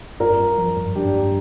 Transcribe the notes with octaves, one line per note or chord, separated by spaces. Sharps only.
G2 F4 A#4
G2
F3
G2
G2 D4 G4
G2